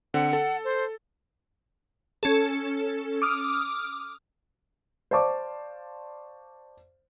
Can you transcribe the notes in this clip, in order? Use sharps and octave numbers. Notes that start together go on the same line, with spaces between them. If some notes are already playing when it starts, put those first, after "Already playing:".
D3 C4 F#5
A4
C5
C#4 A4
D6 D#6 F6
C5 D5 F5 A5 C#6 D6